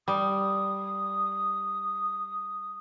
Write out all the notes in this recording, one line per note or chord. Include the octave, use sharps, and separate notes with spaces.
G3 D#6